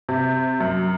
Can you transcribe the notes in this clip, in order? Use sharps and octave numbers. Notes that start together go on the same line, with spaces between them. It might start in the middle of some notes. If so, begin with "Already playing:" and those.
C3
F#2